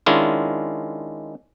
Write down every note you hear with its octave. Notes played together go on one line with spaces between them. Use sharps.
D#3 G#3 C#4 D4 E4 F4